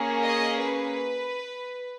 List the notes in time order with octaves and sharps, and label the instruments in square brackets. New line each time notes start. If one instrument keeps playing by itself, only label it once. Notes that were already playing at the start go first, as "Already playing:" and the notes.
Already playing: [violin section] A#3 C#4 G#4
D#5
B4